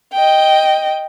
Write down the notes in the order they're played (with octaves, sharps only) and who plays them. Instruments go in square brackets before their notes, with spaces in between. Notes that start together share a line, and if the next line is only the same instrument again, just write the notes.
[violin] D#5 G5